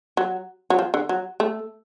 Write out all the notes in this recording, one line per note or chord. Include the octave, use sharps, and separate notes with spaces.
F#3
F#3
F3
D3
F#3
A3